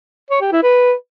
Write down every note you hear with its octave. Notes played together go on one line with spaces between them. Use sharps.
C#5
G4
E4
B4